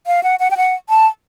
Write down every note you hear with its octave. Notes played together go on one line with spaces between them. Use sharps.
F5
F#5
F#5
G5
F#5
A5